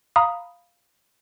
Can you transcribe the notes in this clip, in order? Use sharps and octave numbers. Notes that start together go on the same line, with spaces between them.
F5 A#5 B5 D#6